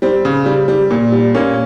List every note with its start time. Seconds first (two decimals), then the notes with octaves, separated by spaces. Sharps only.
0.02 G3 C4
0.25 C#3
0.46 G3
0.68 G3
0.91 A#2
1.12 G3
1.34 A#2 A#3 C#4